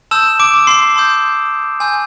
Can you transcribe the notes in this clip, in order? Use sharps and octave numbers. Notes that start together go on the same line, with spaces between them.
A5 C6 D#6 E6 G6 E7
D6 D7
C6 C7
A5 C6 D#6 G6
G#5 C6 E6 G6